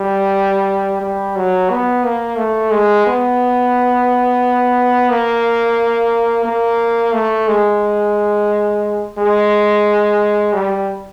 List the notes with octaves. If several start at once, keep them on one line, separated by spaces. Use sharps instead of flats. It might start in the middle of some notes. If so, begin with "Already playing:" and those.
Already playing: G3
G3
F#3
B3
A#3
A3
G#3
B3
A#3
A#3
A3
G#3
G#3
G3